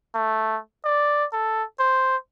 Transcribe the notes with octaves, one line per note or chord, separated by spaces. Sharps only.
A3
D5
A4
C5